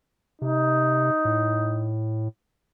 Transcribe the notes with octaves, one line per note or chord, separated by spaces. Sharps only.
C3 D#4
A2